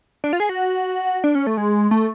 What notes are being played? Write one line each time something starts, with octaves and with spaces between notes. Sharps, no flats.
D4
F4
G#4
F#4
D4
C#4
A3
G#3
A3